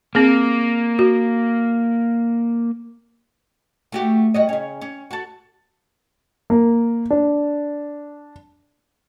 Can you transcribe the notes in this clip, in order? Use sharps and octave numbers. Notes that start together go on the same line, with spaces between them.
A#3 C4 G#4
F#4
A3 F#4 G4
G3 F#4 D#5
C#3 C#4
C#4
F#4 A4
A#3
D4